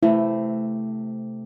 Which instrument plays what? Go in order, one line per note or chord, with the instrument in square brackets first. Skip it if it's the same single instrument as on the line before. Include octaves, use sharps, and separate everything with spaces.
[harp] C3 A3 [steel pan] E4